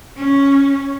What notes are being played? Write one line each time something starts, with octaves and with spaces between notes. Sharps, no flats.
C#4